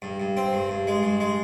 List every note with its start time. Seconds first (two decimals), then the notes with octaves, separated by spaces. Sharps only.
0.02 G2
0.20 G2
0.37 C4
0.53 G2
0.69 G2
0.87 G#3
1.03 G2
1.20 G#3